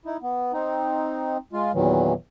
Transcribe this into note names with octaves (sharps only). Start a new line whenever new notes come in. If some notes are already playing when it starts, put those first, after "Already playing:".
D#4 E4
B3
C4 D#4
G#3 F4
E2 A#2 D#3 E3 F#3